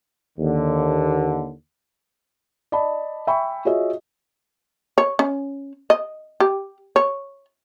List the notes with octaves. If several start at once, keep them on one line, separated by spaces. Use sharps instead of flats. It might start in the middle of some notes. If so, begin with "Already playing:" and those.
D#2 D3
D5 D#5 A5 B5
E5 G5 G#5 B5 C#6
F4 F#4 G#4 C#5 D#5 E5
C#5
C#4
D#5
G4
C#5